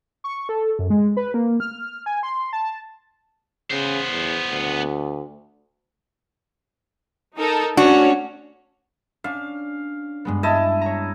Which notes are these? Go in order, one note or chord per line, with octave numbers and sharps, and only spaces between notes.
C#6
A4
F#2
G#3
B4
A#3
F6
G#5
C6
A5
C#3 B3 C5
E2
D2
D#4 A4 A#4
A3 C#4 D4 F#4 C#5
C#4 D4 F5
G2 G#3 B3
E4 G4 D#5 A5
C#5 A#5